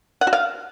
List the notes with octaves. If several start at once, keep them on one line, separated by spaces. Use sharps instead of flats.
F#5
F#4
F5